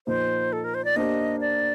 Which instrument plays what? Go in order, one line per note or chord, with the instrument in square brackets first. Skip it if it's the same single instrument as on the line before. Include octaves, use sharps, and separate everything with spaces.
[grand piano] A#2 F3 A#3 D#4 [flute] C5
[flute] A4
A#4
C5
D5
[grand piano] A#3 D4 G4 C5 [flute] D#5
[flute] D5